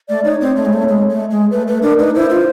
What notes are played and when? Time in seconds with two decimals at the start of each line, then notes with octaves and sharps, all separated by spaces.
0.09 A3 D5
0.24 D#4 C#5
0.41 C4
0.56 A3
0.65 G#3
0.73 A3
0.88 G#3
1.10 A3
1.31 G#3
1.51 A3 B4
1.67 A3 B4
1.82 D4 A#4
1.99 D#4 B4
2.15 E4 C5
2.30 F4